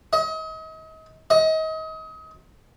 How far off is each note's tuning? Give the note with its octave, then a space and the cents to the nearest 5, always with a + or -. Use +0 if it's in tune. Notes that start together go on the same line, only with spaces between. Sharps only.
D#5 +35
D#5 +30